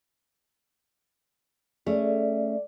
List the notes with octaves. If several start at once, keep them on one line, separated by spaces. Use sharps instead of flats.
A3 C#4 G#4 D5